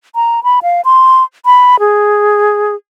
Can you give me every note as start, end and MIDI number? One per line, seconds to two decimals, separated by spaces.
0.15 0.43 82
0.44 0.60 83
0.63 0.81 77
0.85 1.23 84
1.45 1.79 83
1.79 2.75 68